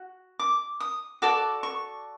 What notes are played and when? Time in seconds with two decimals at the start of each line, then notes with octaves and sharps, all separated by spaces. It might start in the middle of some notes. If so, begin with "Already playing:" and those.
Already playing: F#4
0.39 D6
0.80 D#6
1.22 F#4 A4 D5 D6
1.63 C#6